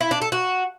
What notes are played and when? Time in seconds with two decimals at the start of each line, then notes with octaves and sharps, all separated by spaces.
0.01 E4
0.11 D4
0.22 A4
0.32 F#4